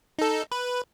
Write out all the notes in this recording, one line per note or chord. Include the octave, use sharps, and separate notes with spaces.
D#4 A4
B4